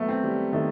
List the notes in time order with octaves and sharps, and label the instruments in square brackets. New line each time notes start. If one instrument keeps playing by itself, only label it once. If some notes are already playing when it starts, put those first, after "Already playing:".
Already playing: [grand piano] F#3 [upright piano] A3 B3
[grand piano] C4
[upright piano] G3
[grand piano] D#3 [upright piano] A3